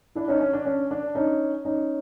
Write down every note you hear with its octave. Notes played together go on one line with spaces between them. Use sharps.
D4 E4
C#4 D#4
C#4
D4
C#4
D4
C#4 D#4
C#4 D#4